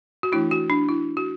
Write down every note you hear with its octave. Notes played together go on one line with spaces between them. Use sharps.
F#4
E3 A3 D4 E4
F#4
D4
E4
F#4